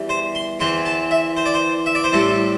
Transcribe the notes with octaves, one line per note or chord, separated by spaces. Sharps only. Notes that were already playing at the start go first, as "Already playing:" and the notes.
Already playing: E2 E3 G3
C5
C6
E2 E3 C4 C6
A5
E5
C5
D5
C5
E5
D5
C5
A2 G3 C4 A4